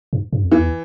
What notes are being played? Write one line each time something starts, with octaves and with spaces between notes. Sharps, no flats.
G2
G2
F2
E3
E2